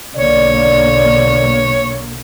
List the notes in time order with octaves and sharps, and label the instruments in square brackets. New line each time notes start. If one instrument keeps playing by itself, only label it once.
[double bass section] B1 D3 A#3 [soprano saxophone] C#5 [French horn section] D5